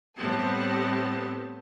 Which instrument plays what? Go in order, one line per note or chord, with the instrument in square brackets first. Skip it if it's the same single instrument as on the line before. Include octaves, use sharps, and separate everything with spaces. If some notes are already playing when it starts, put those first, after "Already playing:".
[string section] A2 G3 B3 C4 A5